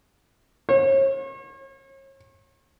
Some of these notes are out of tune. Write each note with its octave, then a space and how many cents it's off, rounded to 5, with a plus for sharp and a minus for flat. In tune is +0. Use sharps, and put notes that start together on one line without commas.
C#5 -40